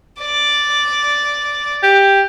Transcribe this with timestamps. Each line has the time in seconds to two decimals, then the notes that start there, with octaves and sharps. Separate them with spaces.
0.20 D5
1.83 G4